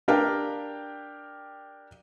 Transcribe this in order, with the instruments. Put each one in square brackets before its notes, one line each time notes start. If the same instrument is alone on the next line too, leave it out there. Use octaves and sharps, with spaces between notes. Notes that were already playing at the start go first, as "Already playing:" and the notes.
[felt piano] D4 G4 A#4 F5 G5